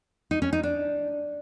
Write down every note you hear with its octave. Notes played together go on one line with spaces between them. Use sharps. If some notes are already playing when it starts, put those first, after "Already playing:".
D#4
C#4
D#4
D4